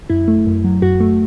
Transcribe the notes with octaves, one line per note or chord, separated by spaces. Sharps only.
F#2 E4
A3
F#2
F#3
F#2 F#4
A3